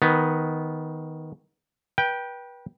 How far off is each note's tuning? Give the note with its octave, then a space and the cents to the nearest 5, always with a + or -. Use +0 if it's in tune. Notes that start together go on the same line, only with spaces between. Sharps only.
D#3 +15 B3 +0
B4 -30 G5 +0